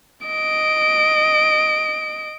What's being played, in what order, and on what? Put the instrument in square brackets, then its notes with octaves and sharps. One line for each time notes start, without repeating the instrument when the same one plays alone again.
[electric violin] D#5 D7